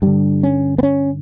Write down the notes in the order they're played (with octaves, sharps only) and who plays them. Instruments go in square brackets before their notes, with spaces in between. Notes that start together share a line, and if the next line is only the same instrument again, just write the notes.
[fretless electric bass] G2 D3 G3
C#4
B3
C#4